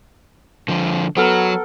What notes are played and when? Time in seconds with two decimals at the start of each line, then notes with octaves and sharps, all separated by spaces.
0.68 D3 F3
1.17 F#3 B3 A4 A#4